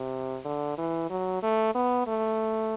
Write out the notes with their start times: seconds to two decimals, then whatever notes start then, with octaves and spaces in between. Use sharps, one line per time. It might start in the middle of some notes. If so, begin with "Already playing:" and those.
Already playing: C3
0.45 D3
0.78 E3
1.10 F#3
1.43 A3
1.75 B3
2.07 A3